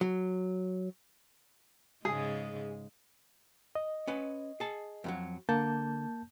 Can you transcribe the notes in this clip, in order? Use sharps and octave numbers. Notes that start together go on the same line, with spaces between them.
F#3
G#2 C#3 G#3 G#4
D#5
C#4 B4
G#4 A5
F2 D#3 F#3
D3 A#3 A5 G6